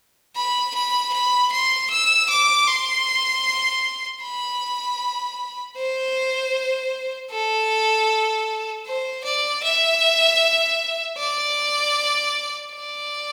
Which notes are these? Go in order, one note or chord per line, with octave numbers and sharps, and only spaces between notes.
B5
B5
B5
C6
E6
D6
C6
B5
C5
A4
C5
D5
E5
D5
D5